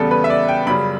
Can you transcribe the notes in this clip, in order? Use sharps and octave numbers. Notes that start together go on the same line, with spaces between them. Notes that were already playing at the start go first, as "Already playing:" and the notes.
Already playing: E2 C#3 G3 B3 A4
B4
E5
D5
G5
F#2 C#3 G3 B5